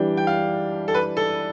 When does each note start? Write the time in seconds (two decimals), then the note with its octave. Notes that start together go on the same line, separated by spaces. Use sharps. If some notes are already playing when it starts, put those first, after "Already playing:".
Already playing: E3 G3 D4 G5
0.17 G5
0.27 F5
0.88 A4
0.95 B4
1.17 A4